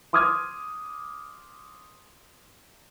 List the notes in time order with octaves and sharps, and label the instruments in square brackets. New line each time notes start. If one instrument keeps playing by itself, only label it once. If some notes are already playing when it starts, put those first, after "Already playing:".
[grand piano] C6 D6 D#6 F6 G#6